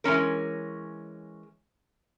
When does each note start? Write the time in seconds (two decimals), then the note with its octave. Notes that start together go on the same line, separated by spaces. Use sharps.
0.04 E3 G#3 C#4 A#4